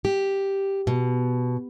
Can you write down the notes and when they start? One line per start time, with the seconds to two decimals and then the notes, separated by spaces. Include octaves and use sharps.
0.05 G4
0.87 B2